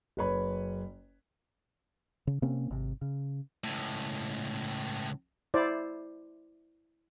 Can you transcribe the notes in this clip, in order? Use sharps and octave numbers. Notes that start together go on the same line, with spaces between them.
F#1 F#2 B4 C#5 B5
C#3
C3 A#3 C4 C#4
G#1 C3
C#3
C#2 A2
E4 C5 D5